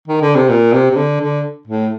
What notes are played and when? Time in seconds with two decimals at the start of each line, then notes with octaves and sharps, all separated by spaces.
0.08 D#3
0.22 D3
0.36 C3
0.49 A#2
0.73 C3
0.90 C3
0.97 D3
1.21 D3
1.68 A2